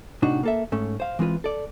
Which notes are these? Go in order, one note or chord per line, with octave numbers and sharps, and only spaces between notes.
A2 C3 D4 D#4 F#4
A#3 A4 E5
G#2 A3 C#4
C5 F5
E3 G#3 C4 F4 B4
A4 D5